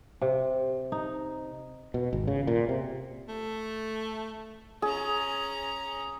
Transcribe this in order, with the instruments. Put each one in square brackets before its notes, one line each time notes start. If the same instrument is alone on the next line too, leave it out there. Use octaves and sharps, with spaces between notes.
[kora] C3
D#4
[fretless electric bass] B2
G#1
C#3
A#2
C3
[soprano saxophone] A3
[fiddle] C#4 A#5 [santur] G#4